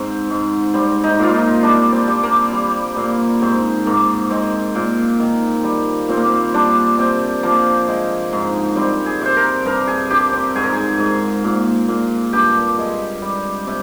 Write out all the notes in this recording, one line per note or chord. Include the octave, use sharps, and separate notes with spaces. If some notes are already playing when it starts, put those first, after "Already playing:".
Already playing: G#2 C4
G#2
G3 C4
D#4
A#2 F4
D#4
G3 D4
C4
G3
A#3
G3
A#2
G#2 C4
G#2 A#3
G#3 C4
A#2
D#3
G3
A#2 C4
A#3
C4
G3 D4
C3 C4
F3 A#3
G#3
G#2
G3 C4
G#4
C3 C5
A#4
G2 A#4
G#4
G2 G4
C4
G#2 G#4
A#4
G#4
G#2
A#2
A#2
G2 G4
G#3
G3
C3